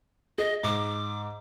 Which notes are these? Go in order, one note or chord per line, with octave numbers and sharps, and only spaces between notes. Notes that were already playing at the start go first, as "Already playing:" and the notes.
G#4 D#5
G#2 D6